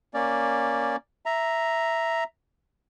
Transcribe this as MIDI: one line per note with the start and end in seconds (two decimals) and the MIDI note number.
0.14 0.96 58
0.14 0.96 61
0.14 0.96 74
1.26 2.24 76
1.26 2.24 82